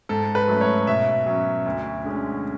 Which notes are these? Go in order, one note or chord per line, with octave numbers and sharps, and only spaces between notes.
G#2 A4
B4
F#3 A3 C#4
C#5
B2 E5
F#3 C#4
D2
D3 G#3 C#4